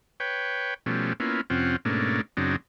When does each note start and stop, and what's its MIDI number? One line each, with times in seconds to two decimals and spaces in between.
0.20 0.74 71
0.20 0.74 73
0.20 0.74 79
0.86 1.13 47
0.86 1.13 53
0.86 1.13 55
0.86 1.13 57
0.86 1.13 61
1.20 1.41 58
1.20 1.41 59
1.20 1.41 61
1.20 1.41 64
1.20 1.41 65
1.50 1.76 41
1.50 1.76 48
1.50 1.76 60
1.50 1.76 61
1.50 1.76 65
1.50 1.76 78
1.85 2.21 44
1.85 2.21 47
1.85 2.21 57
1.85 2.21 58
1.85 2.21 61
1.85 2.21 62
2.37 2.56 42
2.37 2.56 49
2.37 2.56 54
2.37 2.56 60
2.37 2.56 62
2.37 2.56 63